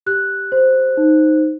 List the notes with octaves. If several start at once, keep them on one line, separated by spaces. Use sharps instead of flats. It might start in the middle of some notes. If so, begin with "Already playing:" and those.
G4 F#6
C5
D#4